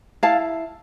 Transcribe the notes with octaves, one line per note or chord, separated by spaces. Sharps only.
E4 F5 A5